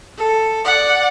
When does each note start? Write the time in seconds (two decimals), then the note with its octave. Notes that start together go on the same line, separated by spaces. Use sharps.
0.19 A4
0.65 D5 F#5